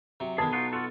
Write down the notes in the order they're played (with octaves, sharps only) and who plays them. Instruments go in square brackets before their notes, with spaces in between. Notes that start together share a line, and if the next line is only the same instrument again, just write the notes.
[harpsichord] C3 F#3
[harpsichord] B1 B3 [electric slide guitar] D#3 E3 G#4 [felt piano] A5
[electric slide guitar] D#4 F4 F#4
F4 F#4 A4